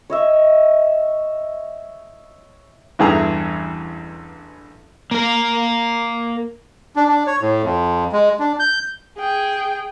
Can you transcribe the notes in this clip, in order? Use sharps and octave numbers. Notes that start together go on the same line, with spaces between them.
C#5 D#5 E5
A1 E2 G2 G#4 A4 A#5
A#3 A#4
D4
D4
C#5
A2
F2
G#3
D4
G6
G#4 G5